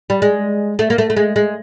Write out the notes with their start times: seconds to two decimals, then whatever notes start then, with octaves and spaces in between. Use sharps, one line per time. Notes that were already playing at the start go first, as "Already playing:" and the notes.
0.10 G3
0.22 G#3
0.79 A3
0.90 A#3
0.98 A3
1.10 A3
1.17 G#3
1.36 G#3